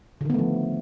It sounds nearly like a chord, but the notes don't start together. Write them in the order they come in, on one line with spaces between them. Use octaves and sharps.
D3 D#3 B3 A3 F3